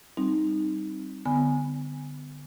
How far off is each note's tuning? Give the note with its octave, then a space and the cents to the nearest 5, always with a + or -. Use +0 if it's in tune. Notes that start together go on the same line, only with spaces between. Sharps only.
G3 +0 C4 +15 D#4 +0
D3 +0 B3 +25 G#5 +0